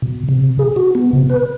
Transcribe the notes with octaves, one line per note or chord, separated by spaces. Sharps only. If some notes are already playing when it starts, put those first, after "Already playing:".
B2
C3
G#4
F#4
B3
C3
B4